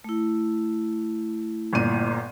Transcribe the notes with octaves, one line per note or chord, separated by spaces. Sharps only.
A3 E4
G1 A#2 D#7